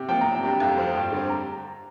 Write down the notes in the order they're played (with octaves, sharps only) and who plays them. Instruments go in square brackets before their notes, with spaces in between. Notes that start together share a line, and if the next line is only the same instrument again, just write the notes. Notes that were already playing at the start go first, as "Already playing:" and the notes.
Already playing: [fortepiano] C3 [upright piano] G4
[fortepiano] F3 A#3 [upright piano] G5
[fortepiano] C3 [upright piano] A#5
[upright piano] G5
[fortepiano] G3 D4 G4 [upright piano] A#5
[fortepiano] F2 [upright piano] G5
[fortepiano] F3 C4
[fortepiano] G2 [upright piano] G5
[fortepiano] D3 G3 C4
[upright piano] A#5